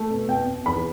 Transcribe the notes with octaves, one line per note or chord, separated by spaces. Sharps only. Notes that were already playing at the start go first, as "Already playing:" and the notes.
Already playing: A3
B2
B2 G5
B2
E2 B5